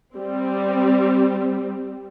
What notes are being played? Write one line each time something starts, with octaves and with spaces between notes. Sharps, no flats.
G3 C4